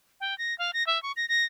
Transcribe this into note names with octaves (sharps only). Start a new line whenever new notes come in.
G5
A#6
F5
A#6
E5
C#6
A#6
A#6